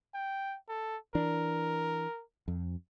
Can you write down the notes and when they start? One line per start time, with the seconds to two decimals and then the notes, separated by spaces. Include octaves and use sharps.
0.14 G5
0.69 A4
1.15 E3 D4 A#4
2.48 F2